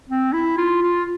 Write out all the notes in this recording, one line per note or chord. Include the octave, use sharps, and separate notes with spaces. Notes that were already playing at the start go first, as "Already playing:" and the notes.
C4
E4
F4
F4